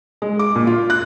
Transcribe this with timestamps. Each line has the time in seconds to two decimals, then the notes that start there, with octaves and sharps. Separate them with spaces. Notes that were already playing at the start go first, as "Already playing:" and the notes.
0.22 G#3
0.39 D6
0.56 A#2
0.67 F4
0.90 F#6